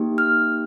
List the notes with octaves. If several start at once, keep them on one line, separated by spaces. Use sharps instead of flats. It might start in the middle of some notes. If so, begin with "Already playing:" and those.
Already playing: A#3 D#4 G4
F6